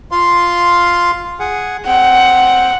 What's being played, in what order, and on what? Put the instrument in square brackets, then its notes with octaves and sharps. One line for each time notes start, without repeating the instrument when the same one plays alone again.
[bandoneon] F4 F5 C6
G#4 F#5
[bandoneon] C4 G5 [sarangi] F#5